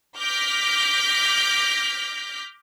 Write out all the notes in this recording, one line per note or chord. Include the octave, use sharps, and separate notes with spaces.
D6 F6 G6 A#6 B6